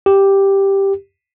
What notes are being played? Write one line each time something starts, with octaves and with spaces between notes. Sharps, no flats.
G4